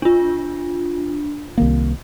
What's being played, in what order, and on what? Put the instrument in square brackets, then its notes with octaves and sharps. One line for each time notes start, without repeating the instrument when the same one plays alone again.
[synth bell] D4 F4
[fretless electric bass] C2 D#3 A#3